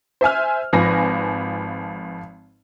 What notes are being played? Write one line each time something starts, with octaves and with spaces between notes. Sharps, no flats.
C5 E5 G#5 F6
G#1 F3 B4 G#5 A#6